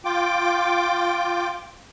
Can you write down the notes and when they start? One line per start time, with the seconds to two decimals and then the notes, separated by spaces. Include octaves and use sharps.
0.05 F4 G5 D6